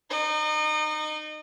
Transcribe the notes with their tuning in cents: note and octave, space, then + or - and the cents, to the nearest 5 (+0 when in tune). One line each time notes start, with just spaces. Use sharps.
D#4 -20 D#5 -35